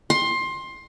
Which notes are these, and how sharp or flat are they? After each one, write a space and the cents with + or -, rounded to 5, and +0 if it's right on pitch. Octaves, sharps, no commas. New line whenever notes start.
C6 +20